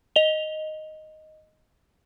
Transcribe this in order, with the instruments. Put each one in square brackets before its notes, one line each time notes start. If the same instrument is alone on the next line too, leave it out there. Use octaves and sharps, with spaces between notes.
[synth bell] D#5 F7 G7